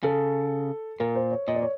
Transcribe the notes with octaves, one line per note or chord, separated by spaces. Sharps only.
C#3 A4
A#2 A#4
C5
C#5
A#2 D#5
D5
C#5